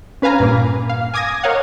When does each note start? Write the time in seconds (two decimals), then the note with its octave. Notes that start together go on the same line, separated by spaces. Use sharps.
0.22 C#4 B4 F5 G#5 A#5
0.40 G2 A#2 A#3
0.89 F5
1.14 G#5 D6 D#6 G#6 A#6
1.43 A#4 C#5 D#5 F5 F#5